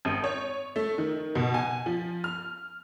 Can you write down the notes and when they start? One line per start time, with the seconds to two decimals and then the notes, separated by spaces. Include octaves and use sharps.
0.05 G#1
0.24 C#5
0.76 A3
0.98 D#3
1.35 B2
1.54 G#5
1.86 F3
2.24 F6